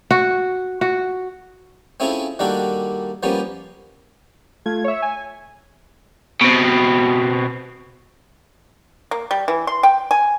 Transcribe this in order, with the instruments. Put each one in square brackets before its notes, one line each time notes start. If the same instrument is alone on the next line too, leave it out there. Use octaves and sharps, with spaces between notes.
[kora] F#4
F#4
[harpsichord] C4 C#4 E4 F4 G#4 A4
D#3 G3 A#3 D4 F#4 A4
F3 G3 A#3 B3 C#4
[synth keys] A3 F4 G#6
C#5 E5
G#5
[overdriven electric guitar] B2 C4
[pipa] A#3
G3
E3
C6
G5
G#5